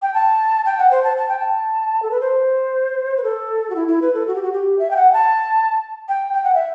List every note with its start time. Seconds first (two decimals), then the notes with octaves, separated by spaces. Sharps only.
0.02 G5
0.14 A5
0.66 G5
0.78 F#5
0.91 C5
1.04 A5
1.17 A5
1.29 G5
1.39 A5
2.03 A4
2.11 B4
2.21 C5
3.17 B4
3.24 A4
3.70 F#4
3.76 E4
3.88 E4
4.02 B4
4.14 A4
4.27 F#4
4.36 G4
4.43 F#4
4.53 G4
4.79 E5
4.91 G5
4.97 F#5
5.13 A5
6.09 G5
6.34 G5
6.44 F#5
6.54 E5